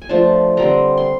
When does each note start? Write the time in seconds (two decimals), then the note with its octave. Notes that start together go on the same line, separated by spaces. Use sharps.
0.02 G#5
0.09 F3 A3 D4 A5
0.57 D3 G3 C4 A#5
0.97 C6